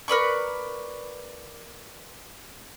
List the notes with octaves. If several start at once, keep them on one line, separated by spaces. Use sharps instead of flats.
A#4 B4 D5 C#6